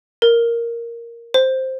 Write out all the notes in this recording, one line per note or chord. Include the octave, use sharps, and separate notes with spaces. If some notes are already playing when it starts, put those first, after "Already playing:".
A#4
C5